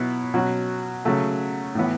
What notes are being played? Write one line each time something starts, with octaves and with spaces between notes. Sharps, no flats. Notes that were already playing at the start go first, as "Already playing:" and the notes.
Already playing: B2 F#3 B3 E4
B2 F#3 C#4 F#4
C#3 F#3 A3
A2 E3 B3